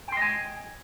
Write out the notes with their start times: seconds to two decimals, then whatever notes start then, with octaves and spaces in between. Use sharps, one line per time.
0.08 G5
0.12 C6
0.17 D#5
0.22 G#5